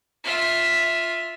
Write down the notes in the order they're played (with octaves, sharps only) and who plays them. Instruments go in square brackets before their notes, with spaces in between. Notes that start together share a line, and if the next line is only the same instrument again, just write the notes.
[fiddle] F4 E5